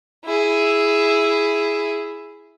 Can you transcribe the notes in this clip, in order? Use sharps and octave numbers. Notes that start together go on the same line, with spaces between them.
E4 G#4